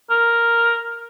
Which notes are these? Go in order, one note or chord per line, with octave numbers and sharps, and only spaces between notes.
A#4